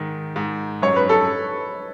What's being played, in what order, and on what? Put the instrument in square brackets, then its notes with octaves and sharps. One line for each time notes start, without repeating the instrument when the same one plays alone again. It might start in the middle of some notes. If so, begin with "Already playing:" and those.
Already playing: [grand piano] G#2 D#3
G#2
[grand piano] F#2 [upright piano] C#5
[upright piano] B4
A4